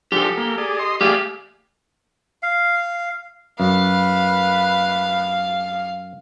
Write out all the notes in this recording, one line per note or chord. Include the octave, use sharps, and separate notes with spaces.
F3 D4 G4 A4
A#3
G#4 D5
D#5 C6
A3 G4 G#4 D5 F5
F5
F#2 B4 F5